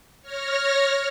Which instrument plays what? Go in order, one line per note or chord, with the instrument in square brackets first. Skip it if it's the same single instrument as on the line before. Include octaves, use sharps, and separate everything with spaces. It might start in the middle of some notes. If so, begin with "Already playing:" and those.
[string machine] C#5 F6 A#6